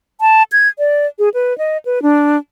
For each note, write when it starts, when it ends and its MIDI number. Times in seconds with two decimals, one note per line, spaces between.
0.21 0.43 81
0.52 0.68 92
0.79 1.06 74
1.19 1.29 68
1.34 1.56 71
1.58 1.77 75
1.85 2.02 71
2.02 2.37 62